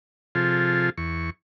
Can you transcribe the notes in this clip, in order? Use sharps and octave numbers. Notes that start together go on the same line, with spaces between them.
C3 F3 F4 G#4 A4
E2 C#6